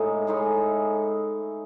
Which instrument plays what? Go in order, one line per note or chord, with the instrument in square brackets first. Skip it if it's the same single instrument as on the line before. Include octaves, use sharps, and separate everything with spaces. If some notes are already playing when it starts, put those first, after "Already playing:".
Already playing: [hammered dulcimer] A2 G#3 D#4 G#4
A2 G#3 D#4 G#4